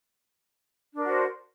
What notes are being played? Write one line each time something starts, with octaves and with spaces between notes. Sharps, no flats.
D4 F#4 A#4 C5